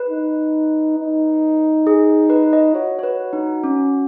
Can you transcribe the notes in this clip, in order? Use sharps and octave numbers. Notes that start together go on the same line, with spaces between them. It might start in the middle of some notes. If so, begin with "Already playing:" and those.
Already playing: B4
D#4
D#4
G#4
B4
D#5
F#4 C#5
C#5
B4
D#4
C#4